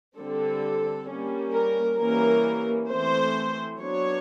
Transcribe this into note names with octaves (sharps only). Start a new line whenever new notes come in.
D3 G3 C4 A4
G3 A#3 C#4
A#4
E3 G3 A#3 C#4 A#4
E3 A3 C4 C5
F#3 B3 D4 C#5